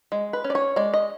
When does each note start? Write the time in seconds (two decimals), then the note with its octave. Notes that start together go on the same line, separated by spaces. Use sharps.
0.12 G#3
0.33 B4
0.44 C#4
0.50 D5
0.55 C#5
0.76 G#3 D5
0.94 D#5